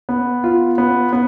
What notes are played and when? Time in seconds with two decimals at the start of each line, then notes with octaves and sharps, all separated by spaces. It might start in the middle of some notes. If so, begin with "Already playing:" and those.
0.09 B3
0.44 F4
0.78 B3
1.13 B3